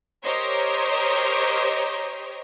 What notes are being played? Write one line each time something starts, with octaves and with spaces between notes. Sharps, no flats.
G4 A#4 C5 C#5 D#5